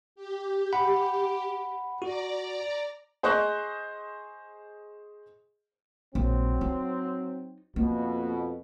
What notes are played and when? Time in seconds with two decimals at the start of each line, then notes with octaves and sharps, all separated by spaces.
0.16 G4
0.73 F#5 B5
2.02 F#4 D5 A#5
3.23 G#4 C5 D#5 C#6 F#6
6.15 A#1 F#3 C4
6.61 D#4
7.76 F2 B2 A#3